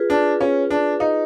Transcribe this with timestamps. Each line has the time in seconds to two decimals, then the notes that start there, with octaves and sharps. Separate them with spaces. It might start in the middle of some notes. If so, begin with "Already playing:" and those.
Already playing: F4 G#4 B4
0.10 D4
0.41 C#4
0.70 D4
1.00 D#4